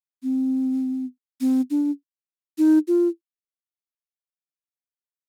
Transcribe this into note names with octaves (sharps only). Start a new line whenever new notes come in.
C4
C4
D4
D#4
F4